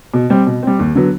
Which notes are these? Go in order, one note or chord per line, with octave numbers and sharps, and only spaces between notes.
B2
G3 C4
B2
G3 C4
D#2
D3 F#3 B3